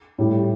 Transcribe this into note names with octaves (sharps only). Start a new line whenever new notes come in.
A2 G3